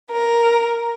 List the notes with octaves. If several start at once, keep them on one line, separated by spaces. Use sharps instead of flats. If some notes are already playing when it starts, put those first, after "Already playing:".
A#4